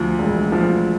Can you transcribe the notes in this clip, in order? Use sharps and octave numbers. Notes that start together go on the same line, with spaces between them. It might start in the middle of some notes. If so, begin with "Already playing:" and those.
Already playing: D2 F3
E1
F3